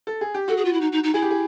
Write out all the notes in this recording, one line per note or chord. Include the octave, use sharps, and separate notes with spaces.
A4
G#4
G4
F#4 A4
G#4
F4
E4
D#4
D#4
D#4
E4 G#4
G4
G#4